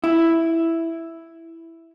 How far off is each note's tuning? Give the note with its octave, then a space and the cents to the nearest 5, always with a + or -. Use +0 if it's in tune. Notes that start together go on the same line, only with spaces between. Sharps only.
E4 +0